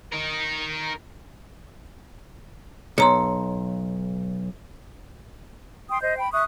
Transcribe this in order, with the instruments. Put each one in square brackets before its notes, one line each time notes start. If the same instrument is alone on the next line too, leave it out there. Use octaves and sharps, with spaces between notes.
[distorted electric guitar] D#4 A#4
[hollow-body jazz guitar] B1 [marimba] C#5 A#5 C6
[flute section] G5 C6 D#6
C5 D#5 G6
G5 B5
E5 C#6 D#6 F#6